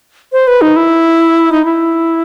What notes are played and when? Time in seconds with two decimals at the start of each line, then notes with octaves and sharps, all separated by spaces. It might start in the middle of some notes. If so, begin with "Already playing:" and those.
0.32 C5
0.47 B4
0.62 D#4
0.76 E4
1.52 D#4
1.65 E4